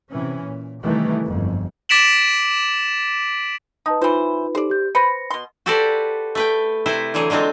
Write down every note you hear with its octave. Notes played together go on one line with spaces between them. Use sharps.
C3 E3 C#4
A#2
C3 D#3 E3 G3 A3
G1 F2 G#2
D6 A6 B6 D7 E7 F#7
D#4 B4 A5 D#6
E3 D#4 F4 B4 C5
D#4 G4 A4 C5 D5
G4 G6
B4 C5 A#6 C#7
B2 C6
F#4 G4 A4 B4 C5 D5
A3 B4 G5
C3 E4 B4 C5
D3 E3 F#3 G#4
D3 F#3 G#3 C4 F4